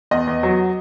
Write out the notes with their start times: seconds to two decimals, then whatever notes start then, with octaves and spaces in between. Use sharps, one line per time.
0.11 E2 D#5
0.27 E2
0.43 F#3